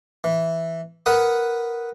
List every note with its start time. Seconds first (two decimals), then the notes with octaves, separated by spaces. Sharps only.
0.24 E3
1.06 A#4 B4 F#5 D#6